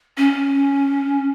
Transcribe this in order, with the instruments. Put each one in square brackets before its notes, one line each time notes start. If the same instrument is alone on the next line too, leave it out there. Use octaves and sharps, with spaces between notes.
[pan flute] C#4